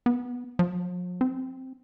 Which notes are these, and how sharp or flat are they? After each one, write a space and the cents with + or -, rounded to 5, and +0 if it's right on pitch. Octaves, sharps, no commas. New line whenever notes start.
B3 -5
F3 +45
C4 +0